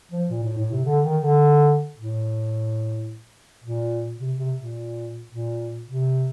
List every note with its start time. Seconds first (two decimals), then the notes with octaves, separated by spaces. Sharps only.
0.11 F3
0.30 A#2
0.44 A2
0.58 A2
0.72 C3
0.85 D3
1.04 D#3
1.23 D3
1.97 A2
3.64 A#2
4.20 C3
4.38 C3
4.56 A#2
5.31 A#2
5.87 C3